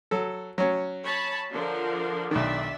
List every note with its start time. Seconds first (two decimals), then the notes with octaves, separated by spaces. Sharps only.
0.11 F#3 A4
0.58 F#3 C#4
1.03 C#5 A5 B5
1.52 D3 F3 A#4
2.31 B1 D#3 D4 D5 E5